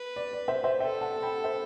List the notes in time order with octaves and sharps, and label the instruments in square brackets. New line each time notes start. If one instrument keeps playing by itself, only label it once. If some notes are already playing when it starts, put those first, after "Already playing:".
Already playing: [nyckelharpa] B4
[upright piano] D5
D5
C5 E5
C5 E5
[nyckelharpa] A4 [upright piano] E5 G5
[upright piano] F#5 A5
G5 B5
C5 E5